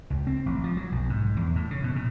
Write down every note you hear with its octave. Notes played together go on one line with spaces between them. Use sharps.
C#2
C4
A1
F3
F#3
B1
G#2
E2
A2
C#3
B2
A#2